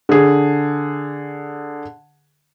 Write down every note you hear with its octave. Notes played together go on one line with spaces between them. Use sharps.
D3 G#4